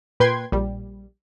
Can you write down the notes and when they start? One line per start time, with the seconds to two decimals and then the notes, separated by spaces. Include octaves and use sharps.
0.20 A#2 B4 G5 C6 G#6
0.52 A#1 G3